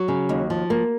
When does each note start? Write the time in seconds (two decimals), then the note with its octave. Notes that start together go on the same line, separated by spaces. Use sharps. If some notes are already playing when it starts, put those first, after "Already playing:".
Already playing: F#3 F#4
0.08 C#3
0.29 D#2
0.50 F3
0.70 A#3